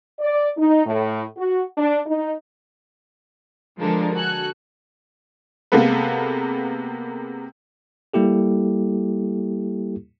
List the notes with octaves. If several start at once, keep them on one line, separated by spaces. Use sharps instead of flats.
D5
D#4
A2
F#4
D4
D#4
D3 F3 G#3 D4 A4 A#4
F#4 A4 G#5 F#6
C3 G#3 A#3 B3 A4 B4
G3 A#3 E4 G4 A4